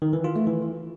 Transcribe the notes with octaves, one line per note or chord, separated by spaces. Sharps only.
D#3
E3
F4
A3
E3